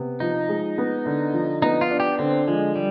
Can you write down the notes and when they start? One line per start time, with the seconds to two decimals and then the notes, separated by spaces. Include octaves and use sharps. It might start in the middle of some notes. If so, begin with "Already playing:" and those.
Already playing: C3 B3
0.20 F3 D#4
0.49 G#3
0.78 B3
1.06 D3
1.33 F3
1.62 B3 D#4
1.81 F4
1.91 D4
2.00 G4
2.19 D3 C4
2.48 F3 G#3
2.76 G3